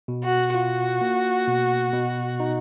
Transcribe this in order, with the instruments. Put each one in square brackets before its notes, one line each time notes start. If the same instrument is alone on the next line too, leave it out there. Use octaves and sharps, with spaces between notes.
[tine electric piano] B2
[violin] F#4
[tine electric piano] F4 [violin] F#4
[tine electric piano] A#3
B2
B2
D#4